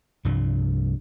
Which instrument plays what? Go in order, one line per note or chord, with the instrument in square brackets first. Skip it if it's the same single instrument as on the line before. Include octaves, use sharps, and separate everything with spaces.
[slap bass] C2 G2 F3